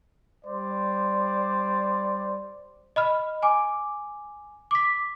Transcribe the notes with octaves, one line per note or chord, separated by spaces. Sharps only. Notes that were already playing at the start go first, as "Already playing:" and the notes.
G3 C5 D5
D#5 B5 F6
G#5 D6
D6 B6